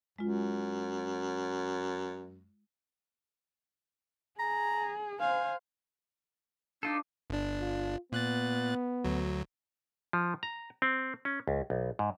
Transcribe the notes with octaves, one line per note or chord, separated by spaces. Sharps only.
F#2 G#3 F4
G#4 A#5
C5 F5 G#5
D4 D#4 F4 A4
G1 D4
F4
A#2 B3 F#6 A6
D2 F#3
F3
A#5
C4
C#4
C#2
B1
G#2